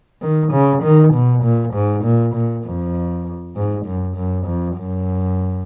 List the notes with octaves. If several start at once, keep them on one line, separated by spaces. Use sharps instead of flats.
D#3
C#3
D#3
B2
A#2
G#2
A#2
A#2
F2
G#2
F#2
F#2
F2
F#2